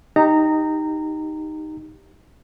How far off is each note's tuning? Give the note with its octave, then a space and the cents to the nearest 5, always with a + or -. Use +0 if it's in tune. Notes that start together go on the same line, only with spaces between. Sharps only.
D#4 +0 G4 +0 A#5 -20